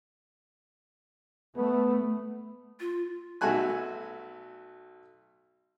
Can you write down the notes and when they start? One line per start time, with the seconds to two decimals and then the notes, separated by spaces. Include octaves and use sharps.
1.57 A3 B3
2.80 F4
3.41 B1 A3 F#4 A4 G#5 F#6